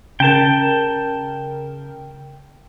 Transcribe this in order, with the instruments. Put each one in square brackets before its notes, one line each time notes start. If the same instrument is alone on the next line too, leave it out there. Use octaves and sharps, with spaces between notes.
[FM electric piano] C#3 A#4 [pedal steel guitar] G5 A5